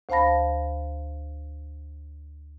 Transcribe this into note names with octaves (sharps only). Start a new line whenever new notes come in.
D2 C5 F5 A5 B5 A#6